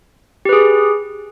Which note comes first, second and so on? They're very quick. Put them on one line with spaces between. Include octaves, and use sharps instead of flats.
G4 B4 G#4